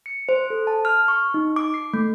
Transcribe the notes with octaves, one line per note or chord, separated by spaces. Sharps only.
C#7
C5
A4
A5
F6
C#6
D#4
D6
C7
A3